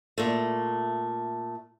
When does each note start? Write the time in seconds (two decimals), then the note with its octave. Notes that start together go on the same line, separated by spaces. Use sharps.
0.18 A#2 A3